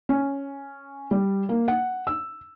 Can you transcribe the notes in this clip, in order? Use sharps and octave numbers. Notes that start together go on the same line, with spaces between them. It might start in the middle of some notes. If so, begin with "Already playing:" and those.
C#4
G3
A#3
F#5
E6